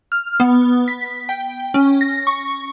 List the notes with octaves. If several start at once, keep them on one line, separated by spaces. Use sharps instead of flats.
F6
B3
B6
G5
C#4
A#6
C#6